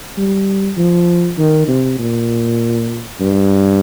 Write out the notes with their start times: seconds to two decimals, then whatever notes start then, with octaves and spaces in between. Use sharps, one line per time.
0.17 G3
0.77 F3
1.38 D#3
1.68 C3
1.99 A#2
3.20 G2